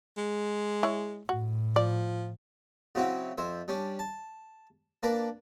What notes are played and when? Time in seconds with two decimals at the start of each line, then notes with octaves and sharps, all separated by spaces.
0.17 G#3
0.83 E4 G#4 C#5
1.29 A2 F#4
1.76 F3 D5
2.95 C#3 F#3 C4 E4 F#4
3.38 F2 C5 E5
3.68 G3 C#4 D4
3.99 A5
5.03 A#3 D4 B4 D5 A#5